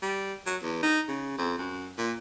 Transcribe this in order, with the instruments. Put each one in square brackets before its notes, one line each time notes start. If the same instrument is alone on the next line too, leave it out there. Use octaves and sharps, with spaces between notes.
[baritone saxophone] G3
F#3
E2
D#4
C#3
F2
F#2
A#2